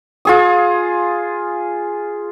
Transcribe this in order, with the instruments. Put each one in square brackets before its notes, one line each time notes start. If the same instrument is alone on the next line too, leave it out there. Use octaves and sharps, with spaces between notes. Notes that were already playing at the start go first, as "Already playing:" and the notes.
[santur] F4 G#4 D#6